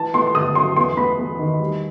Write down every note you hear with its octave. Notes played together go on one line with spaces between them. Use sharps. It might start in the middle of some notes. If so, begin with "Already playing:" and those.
Already playing: E3 A5
B3 C6
C6
G1 D#6
F#2 C6
E2 C6
B3 B5
E2
D#3
G3